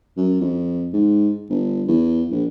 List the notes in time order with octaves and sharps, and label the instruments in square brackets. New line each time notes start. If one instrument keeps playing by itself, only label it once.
[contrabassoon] F#2
F2
G#2
G1
E2
A#1